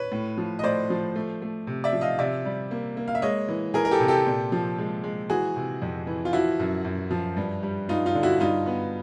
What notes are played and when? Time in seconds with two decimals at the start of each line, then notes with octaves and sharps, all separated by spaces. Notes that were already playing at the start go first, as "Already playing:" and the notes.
Already playing: B4 C#5
0.12 A2
0.37 F3
0.59 D#5
0.63 A2 C5 D5
0.90 F3
1.16 A3
1.42 A3
1.67 C3
1.84 D5 E5
1.93 F3
2.01 D#5 F5
2.19 C3 D5 E5
2.45 G3
2.71 A#3
2.97 A#3
3.08 F5
3.15 E5
3.22 G#3 C#5 D#5
3.48 E3
3.74 E3 G#4 A#4
3.85 A#4
3.91 G4 A4
4.00 C3
4.08 G4 A4
4.26 A#2
4.52 F3
4.78 G#3
5.04 G#3
5.30 E3 F#4 G#4
5.56 C3
5.82 F2
6.07 E3
6.25 F4
6.33 F3 E4 F#4
6.60 F#2
6.85 F#2
7.11 F3
7.37 G2
7.63 G3
7.89 G2 D#4 F4
8.06 D#4 F4
8.15 D3
8.23 E4 F#4
8.40 G2 D#4 F4
8.66 B3